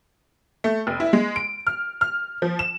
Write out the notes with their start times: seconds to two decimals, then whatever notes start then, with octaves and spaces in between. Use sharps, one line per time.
0.64 A3
0.87 F1
1.00 E4
1.13 G#3
1.36 D7
1.67 F6
2.01 F6
2.42 F3
2.59 E7